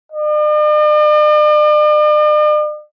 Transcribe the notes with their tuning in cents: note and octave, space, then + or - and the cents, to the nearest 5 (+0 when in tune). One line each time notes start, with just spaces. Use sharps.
D5 +45